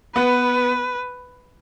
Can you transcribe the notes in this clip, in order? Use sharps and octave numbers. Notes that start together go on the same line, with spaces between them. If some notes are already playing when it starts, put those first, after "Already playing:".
B3 B4